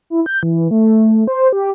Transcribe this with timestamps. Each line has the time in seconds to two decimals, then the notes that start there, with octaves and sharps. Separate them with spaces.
0.10 E4
0.26 G6
0.43 E3
0.71 A3
1.27 C5
1.53 G4